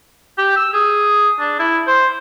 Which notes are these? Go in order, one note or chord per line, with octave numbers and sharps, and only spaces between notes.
G4
E6
G#4
D4
E4
C5